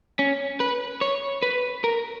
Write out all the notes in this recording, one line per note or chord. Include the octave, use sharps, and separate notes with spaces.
C#4
B4
C#5
B4
A#4